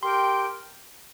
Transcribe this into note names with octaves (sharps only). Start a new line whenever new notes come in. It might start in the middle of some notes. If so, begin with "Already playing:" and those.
G4 A#4 G5 C6